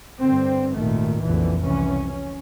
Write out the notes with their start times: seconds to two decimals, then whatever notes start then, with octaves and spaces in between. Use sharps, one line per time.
0.21 G2 D3 C4
0.77 G#1 D#2 A#2 D#3 A3
1.22 F1 B1 F2 A#2 D3 E3
1.63 C2 F2 C#3 E3 C#4
2.07 C#4